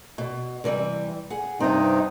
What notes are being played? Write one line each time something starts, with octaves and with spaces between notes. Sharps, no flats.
B2
C3 E3 G3
G#4 F#5
G2 C3 B3 C4 D#4